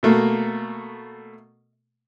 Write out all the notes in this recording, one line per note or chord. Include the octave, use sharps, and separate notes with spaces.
B2 A3 A#3